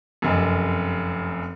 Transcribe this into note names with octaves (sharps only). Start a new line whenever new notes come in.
F1 F#2